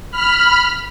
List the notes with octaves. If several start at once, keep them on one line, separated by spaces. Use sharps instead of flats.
B5 F6